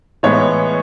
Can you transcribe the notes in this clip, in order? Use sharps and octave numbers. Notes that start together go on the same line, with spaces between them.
A2 E3 G#3 B3 C#5